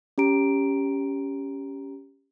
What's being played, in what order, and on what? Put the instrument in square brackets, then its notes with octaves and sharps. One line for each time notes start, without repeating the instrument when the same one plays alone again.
[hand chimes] C#4 G4 A#5 D7